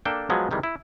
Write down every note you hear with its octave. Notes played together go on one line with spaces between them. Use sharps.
A#3 D4 A4 G5
F3 F#3 G#3 B3
C3 D#3 E3 G3 G#3
E4